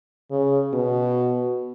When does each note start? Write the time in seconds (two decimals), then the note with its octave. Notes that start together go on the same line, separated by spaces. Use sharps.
0.31 C#3
0.73 B2